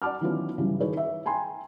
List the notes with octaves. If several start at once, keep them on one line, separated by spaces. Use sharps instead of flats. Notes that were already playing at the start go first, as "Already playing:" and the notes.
D5 F#5 A5 D6 F6
D#3 E3 F#3 B3 C#4 F4
G2 C#3 E3 F#3 G3
D#3 E3 G#4 B4 C#5
E5
G5 G#5 A#5 C6